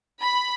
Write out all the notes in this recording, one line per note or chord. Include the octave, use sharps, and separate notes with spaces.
B5